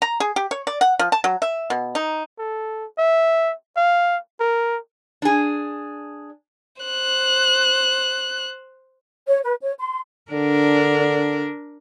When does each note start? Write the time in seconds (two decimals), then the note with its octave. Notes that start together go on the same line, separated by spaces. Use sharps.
0.02 A#5
0.20 G#4
0.36 G4
0.51 C#5
0.67 D5
0.81 F#5
0.99 F3
1.12 A5
1.24 F#3
1.42 E5
1.70 B2
1.95 D#4
2.39 A4
2.98 E5
3.77 F5
4.40 A#4
5.22 D4 G#4
6.82 C5 F#6
9.26 C#5
9.43 B4
9.61 C#5
9.79 C6
10.31 D3 D4 A#4